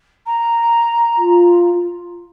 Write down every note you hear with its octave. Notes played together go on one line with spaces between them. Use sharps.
A#5
F4